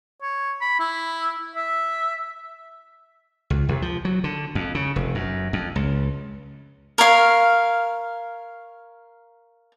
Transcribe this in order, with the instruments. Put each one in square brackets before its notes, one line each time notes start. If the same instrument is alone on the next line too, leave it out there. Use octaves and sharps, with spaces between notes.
[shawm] C#5
B5
E4
E5
[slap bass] C#2
C2
F3
F#3
D3
F2
C#3
F1
F#2
F2
C#2
[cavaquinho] A#4 C#5 F5